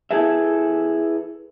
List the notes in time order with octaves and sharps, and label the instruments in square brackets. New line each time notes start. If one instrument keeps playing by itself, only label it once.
[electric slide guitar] E4 G#4 A4 B4 E5